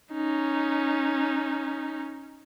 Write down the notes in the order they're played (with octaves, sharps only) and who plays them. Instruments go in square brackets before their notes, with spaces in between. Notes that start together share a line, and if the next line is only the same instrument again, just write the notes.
[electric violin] C#4 D#4